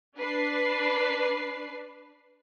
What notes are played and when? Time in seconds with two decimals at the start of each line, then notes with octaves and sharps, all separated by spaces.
0.18 D4 B4 C7